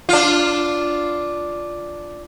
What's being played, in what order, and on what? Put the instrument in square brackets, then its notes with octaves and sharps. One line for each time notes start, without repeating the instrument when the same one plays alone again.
[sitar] D4 F4